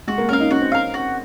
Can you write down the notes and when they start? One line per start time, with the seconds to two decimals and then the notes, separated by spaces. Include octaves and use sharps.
0.07 G#3 F#4
0.18 A#3
0.29 C#4 A#4 F5
0.40 D#4
0.51 C#4 F#4
0.61 C4
0.72 C#4 A#4 F5
0.94 F#4